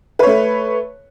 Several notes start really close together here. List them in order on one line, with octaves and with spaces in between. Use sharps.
B4 C#5 A3